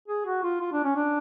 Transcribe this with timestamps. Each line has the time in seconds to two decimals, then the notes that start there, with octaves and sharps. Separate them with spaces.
0.08 G#4
0.25 F#4
0.43 F4
0.61 F4
0.72 D4
0.84 C#4
0.96 D4